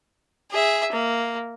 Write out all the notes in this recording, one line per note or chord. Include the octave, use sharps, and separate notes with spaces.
G#4 E5
A#3